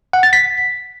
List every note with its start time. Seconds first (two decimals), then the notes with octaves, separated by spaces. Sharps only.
0.13 F#5
0.23 A6
0.33 B6